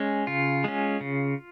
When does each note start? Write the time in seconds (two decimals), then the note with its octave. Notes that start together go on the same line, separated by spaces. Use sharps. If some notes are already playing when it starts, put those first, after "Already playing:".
Already playing: G#3 C#4
0.27 C#3 F4
0.64 G#3 C#4
1.01 C#3